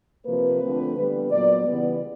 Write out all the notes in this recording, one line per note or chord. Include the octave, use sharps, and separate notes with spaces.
C3 F3 A#3 B4
D3 F3 A3 C4
D3 G3 B3
A#2 F#3 B3 D5
C#3 E3 G3 B3